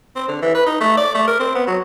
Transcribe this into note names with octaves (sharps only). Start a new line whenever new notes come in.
C4
D3
E3
B4
D#4
A3
D5
A3
A#4
C4
B3
F#3